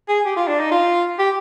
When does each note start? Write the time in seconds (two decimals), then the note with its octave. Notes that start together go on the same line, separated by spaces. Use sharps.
0.08 G#4
0.25 G4
0.36 F4
0.48 D4
0.59 D#4
0.71 F4
1.19 G4